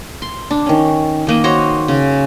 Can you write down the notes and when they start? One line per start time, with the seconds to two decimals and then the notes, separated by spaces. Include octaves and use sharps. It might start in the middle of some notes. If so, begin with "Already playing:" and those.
0.22 C6
0.51 D4
0.66 D#3 C#4
1.27 D#3 A#3 D#5
1.44 F#4 C5 C#5 D#5
1.88 C#3